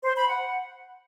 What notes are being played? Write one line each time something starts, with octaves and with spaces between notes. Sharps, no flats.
C5
B5
F#5